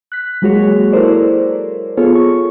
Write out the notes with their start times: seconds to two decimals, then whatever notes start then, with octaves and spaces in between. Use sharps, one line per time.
0.12 F#6 B6
0.42 F#3 G#3 A#3 F#4 G#4 C#5
0.93 E4 A4 A#4 C5 D5
1.97 B3 F4 G#4 A4 C#5
2.15 C#6